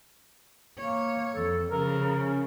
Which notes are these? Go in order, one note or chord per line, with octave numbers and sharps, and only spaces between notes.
A#3 C#5
F2 A4
C#3 F3 A#4
C#4